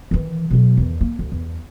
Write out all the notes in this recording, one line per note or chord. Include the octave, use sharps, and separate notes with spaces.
D#3 E3
B2 F#3
E2 D#3
A#3
D2
E2